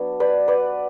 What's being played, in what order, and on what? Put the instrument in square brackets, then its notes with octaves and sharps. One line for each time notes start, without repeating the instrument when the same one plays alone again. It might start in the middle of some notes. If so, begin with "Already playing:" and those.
Already playing: [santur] F#3 B3 D4
B4 D5
B4 D5